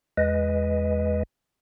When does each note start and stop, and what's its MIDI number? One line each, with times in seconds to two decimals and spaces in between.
0.17 1.23 40
0.17 1.23 56
0.17 1.23 71
0.17 1.23 75